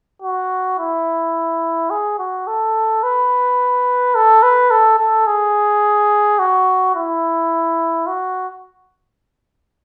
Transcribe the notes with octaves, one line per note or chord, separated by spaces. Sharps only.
F#4
E4
G#4
F#4
A4
B4
A4
B4
A4
A4
G#4
F#4
E4
F#4